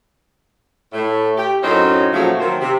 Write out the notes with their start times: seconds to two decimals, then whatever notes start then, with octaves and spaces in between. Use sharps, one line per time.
0.93 A2 A3
1.37 G4
1.63 F#2 A2 F#3 C4 C#4 D#4
2.13 A#2 C#3 F3 F#3 A3
2.39 D#3 F#3 A#3 C4
2.60 C3